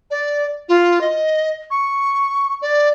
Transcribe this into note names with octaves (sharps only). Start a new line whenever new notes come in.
D5
F4
D#5
C#6
D5